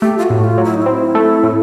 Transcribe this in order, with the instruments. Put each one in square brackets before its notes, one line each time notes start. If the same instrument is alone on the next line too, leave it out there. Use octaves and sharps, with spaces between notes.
[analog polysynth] A3 [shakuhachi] G4
[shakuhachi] F4
F#4
[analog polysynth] A2
[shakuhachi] F4
[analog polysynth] F#3
[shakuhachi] E4
D#4
[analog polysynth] C4 [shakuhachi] E4
[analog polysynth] A3
A2